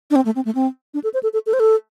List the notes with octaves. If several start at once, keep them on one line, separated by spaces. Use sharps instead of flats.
D4
C4
A3
C4
A3
C4
D4
A4
C5
A4
A4
A4
C5
A4